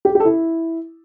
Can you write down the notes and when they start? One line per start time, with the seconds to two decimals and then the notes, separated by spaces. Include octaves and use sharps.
0.05 G4
0.10 G#4
0.15 G4
0.20 A4
0.25 E4